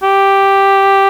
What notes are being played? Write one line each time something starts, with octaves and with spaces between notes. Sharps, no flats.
G4